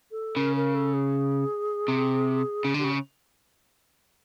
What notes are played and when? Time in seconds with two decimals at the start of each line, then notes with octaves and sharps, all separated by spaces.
0.11 A4
0.36 C#3 A#4
0.56 A#4
0.75 A4
0.94 G#4
1.88 C3
2.65 C#3
2.74 D3 G4
2.84 C#3